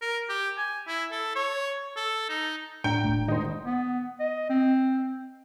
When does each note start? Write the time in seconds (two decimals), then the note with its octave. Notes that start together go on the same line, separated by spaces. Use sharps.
0.02 A#4
0.29 G4
0.57 G#5
0.87 E4
1.12 A4
1.35 C#5
1.96 A4
2.29 D#4
2.84 A2 D4 G5 A#5
3.04 D#1 A#2 A3
3.28 D#3 G#3 D#4 C5
3.65 B3
4.20 D#5
4.49 C4